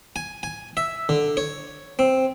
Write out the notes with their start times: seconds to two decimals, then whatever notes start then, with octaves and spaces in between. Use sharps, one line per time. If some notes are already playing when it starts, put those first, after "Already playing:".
0.16 G#5
0.43 G#5
0.77 E5
1.09 D3
1.37 C#5
1.99 C4